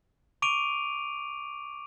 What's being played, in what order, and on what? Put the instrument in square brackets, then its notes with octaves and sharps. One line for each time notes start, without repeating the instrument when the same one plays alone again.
[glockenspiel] C#6 D6 D7 D#7 F7